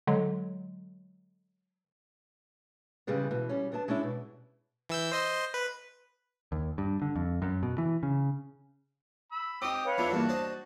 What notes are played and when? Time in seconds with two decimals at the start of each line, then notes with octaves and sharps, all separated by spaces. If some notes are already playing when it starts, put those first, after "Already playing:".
0.07 D3 F#3 G#3
3.07 C#3 E3 G3 G#3 B3
3.31 B2 E3
3.49 G3 C#4
3.72 D2 B3 D4 D5 A5
3.88 G#3 C#4 D4 E4
4.03 B2
4.89 E3 E6 G6
5.12 C5 D#5 C6
5.54 B4
6.52 D#2
6.78 G2
7.02 D3
7.16 F2
7.42 F#2
7.63 B2
7.78 E3
8.03 C#3
9.32 B5 E6
9.62 C4 D#4 G4 D#6
9.84 B4 C#5 F5
9.98 F2 F3 A3 B3 D4 E4
10.11 E2 G2 A#3 F#4 A5
10.29 D4 C5 D#5